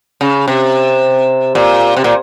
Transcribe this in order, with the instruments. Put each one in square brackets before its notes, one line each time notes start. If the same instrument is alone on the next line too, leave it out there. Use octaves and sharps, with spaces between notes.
[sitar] C#3
C3
A#2
C3
A#2